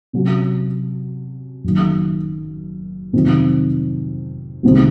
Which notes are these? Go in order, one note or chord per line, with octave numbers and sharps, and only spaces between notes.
C3 F#3 C#4
F#1 F#2 D#3
F2 C3 D#3 F#3 C4
C2 C3 D#3 G#3 C4